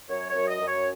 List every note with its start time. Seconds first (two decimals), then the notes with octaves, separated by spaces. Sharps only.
0.09 F#2 C#5
0.29 C#5
0.35 F#2
0.48 D#5
0.61 F#2
0.67 C#5